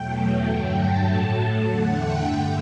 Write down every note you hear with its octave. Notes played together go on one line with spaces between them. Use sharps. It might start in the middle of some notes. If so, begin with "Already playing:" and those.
Already playing: E2 B2 F#3 A3 G5
G5
G2 D3 F#3 A3
A5
A2 F#3 A3
A5
E2 D3 A3 F#5
G5
G2 D3 A3